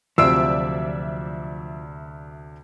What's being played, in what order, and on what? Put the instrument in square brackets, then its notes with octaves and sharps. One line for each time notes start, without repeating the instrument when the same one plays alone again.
[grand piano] D2 C3 F#3 [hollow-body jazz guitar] F3 [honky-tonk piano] D5 E5 D7 [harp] E6